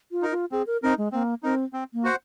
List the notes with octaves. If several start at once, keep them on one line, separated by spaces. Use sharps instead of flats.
F4
D#4 A#4
F4
C4 G#4
A#4
C4 D#4 A#4
G#3
A#3 C4
C4 D#4 A#4
C4
A#3
F#4 C5 F#5